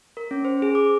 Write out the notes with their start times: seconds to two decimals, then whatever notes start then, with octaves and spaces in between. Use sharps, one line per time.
0.17 A#4
0.31 C#4
0.45 C5
0.62 G#4
0.75 D6